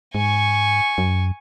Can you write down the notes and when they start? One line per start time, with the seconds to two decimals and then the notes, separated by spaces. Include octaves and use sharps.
0.15 G#2 G#5 C#6
0.98 F#2